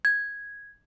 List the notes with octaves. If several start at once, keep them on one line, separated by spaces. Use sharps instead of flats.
G#6